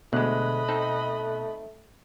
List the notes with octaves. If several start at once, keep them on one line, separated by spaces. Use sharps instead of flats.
D2 B2 G#3 A3 D#5 B5 F#6
C4 D#4 A4